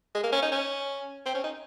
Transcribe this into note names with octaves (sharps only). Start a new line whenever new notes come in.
G#3
A#3
C#4
D#4
C#4
C4
C#4
D#4